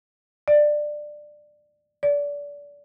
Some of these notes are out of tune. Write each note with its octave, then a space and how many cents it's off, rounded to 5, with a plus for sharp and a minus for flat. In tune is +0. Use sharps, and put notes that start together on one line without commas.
D5 +15
D5 -25